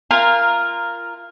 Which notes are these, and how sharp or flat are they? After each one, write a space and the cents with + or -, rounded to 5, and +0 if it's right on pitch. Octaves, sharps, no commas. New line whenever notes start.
F4 -20 A#4 +0 G#5 -35